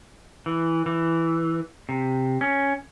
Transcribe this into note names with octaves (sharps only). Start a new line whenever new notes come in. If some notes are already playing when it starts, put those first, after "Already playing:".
E3
E3
C3
C#4